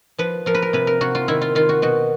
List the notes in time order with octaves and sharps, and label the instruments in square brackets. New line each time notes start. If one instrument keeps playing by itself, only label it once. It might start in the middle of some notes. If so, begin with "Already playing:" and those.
[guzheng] F3 B4
F3 A#4
B4
A#4
C3 B4
A#4
C3 F#4
F4
D#3 E4
F4
D#3 F4
F#4
B2 F#4